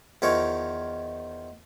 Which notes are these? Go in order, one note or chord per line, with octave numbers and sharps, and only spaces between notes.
E2 D#3 F3 A#4 C#5